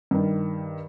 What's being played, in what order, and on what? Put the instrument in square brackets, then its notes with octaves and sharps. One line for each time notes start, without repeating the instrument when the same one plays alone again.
[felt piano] G2 D#3